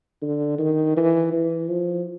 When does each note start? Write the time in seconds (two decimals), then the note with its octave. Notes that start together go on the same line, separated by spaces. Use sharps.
0.22 D3
0.59 D#3
0.97 E3
1.33 E3
1.70 F3